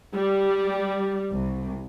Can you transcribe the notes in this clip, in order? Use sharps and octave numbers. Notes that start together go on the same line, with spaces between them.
G3
C2